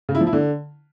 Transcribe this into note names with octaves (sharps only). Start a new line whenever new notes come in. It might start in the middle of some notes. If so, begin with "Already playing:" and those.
C#3
E4
F3
E4
D3